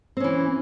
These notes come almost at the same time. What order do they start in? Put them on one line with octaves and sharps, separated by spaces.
C4 C#4 E3